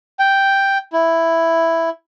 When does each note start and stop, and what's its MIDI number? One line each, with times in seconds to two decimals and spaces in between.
0.19 0.78 79
0.93 1.89 64